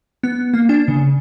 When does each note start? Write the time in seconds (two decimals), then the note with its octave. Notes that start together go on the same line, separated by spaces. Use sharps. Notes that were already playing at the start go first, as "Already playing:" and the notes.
0.23 B3
0.53 A#3
0.69 D4
0.88 C#3